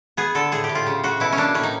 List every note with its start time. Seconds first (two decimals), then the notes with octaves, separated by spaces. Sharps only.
0.17 B3 G#4
0.35 D3 A4
0.52 A2 G#4
0.64 G4
0.69 A2
0.75 F4
0.87 C#3
1.03 C#3 F#4
1.20 B2 E4
1.33 C#4
1.38 A#3 D4
1.54 A2 C#4
1.63 D#4